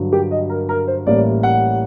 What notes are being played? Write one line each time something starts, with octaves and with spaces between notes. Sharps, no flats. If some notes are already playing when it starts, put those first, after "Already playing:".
Already playing: G2 D3 F#3
G4
D#5
A#4
A#4
C5
A1 A2 G3 A#3 D5
F#5